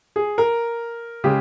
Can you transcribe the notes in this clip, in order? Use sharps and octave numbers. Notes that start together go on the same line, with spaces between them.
G#4
A#4
C#3 G#3 G4